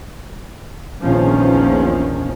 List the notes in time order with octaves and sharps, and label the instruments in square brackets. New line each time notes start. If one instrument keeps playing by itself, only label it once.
[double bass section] A#1 E2 D#3 F3 C#4